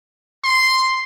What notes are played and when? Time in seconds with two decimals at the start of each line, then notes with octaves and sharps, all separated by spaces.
0.44 C6